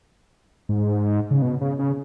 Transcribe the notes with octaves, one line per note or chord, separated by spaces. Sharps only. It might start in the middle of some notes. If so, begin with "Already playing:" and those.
G#2
C#3
B2
C#3
C#3